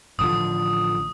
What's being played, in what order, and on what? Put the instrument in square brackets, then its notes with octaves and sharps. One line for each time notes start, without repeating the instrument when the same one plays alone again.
[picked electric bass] A1 D3 F3 [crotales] D#6